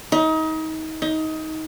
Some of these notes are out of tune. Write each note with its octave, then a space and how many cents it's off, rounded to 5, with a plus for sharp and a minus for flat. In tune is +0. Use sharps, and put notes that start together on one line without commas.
D#4 +30
D#4 +20